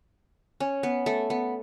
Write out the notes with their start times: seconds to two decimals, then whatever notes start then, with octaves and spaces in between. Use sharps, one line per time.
0.60 C#4
0.83 B3
1.06 A3
1.30 B3